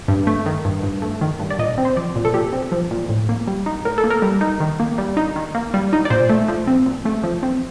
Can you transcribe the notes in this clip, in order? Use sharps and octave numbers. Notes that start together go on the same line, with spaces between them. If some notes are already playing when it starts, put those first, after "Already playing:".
G2
A3
D#3
G2
G2
A3
D#3
G2
D5
A#2 D#5
C4
C5
F3 D5
A#2
A4
A#2 G4
C4
F3
A#2
A2
A#3
G3
D#4
A2 A#4
A4
A#3
A#4
G3
D#4
D#3
A#3
G3
D#4
D#3
A#3
G3
D#4
D5
A#2 C5
A3
F3
C4
A#2
A3
F3
C4